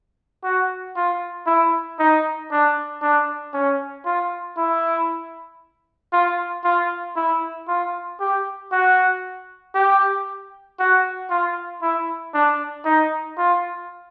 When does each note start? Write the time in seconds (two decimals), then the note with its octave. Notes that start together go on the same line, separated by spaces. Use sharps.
0.44 F#4
0.96 F4
1.47 E4
1.99 D#4
2.51 D4
3.02 D4
3.53 C#4
4.05 F4
4.57 E4
6.12 F4
6.64 F4
7.16 E4
7.67 F4
8.20 G4
8.72 F#4
9.74 G4
10.79 F#4
11.30 F4
11.82 E4
12.34 D4
12.85 D#4
13.38 F4